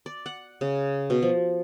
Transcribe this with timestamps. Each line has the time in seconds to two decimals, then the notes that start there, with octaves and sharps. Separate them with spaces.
0.06 D5
0.26 F#5
0.61 C#3
1.10 B2
1.22 F3